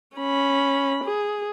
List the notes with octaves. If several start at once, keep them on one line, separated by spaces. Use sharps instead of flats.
C#4 B5
G#4